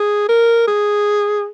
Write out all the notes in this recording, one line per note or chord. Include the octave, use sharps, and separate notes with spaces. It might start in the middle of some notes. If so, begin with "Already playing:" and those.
Already playing: G#4
A#4
G#4